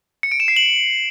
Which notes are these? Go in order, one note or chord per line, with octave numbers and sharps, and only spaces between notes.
C#7
D7
E7
C7
F#7